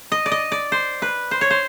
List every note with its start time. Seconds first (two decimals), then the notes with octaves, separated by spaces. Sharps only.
0.12 D#5
0.26 D5
0.32 D#5
0.52 D5
0.72 C5
1.02 B4
1.31 C5
1.41 C#5
1.50 C5